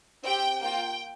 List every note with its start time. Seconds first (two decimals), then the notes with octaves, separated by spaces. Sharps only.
0.24 C4 G4 G5
0.61 A#3 F4 G5